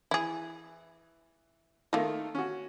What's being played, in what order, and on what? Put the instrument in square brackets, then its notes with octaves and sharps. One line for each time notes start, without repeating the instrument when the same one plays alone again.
[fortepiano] E3 [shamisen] E4 G#4
[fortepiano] D#3 A3 F4 [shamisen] A#3 D#4
[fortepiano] C#4 F#4